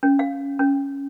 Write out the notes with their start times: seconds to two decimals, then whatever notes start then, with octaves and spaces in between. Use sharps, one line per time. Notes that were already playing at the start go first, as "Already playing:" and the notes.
0.03 C#4
0.19 F5
0.59 C#4